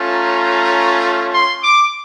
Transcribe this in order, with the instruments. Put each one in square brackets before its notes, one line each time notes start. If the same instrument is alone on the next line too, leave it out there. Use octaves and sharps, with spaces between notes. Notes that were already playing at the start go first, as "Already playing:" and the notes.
Already playing: [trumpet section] A3 C#4 F4
A#5
C6
D6